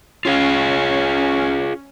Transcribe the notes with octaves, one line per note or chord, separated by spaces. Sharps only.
C#4 F4 G#4 F5